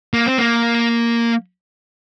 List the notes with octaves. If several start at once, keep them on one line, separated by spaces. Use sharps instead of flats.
A#3
C4
A#3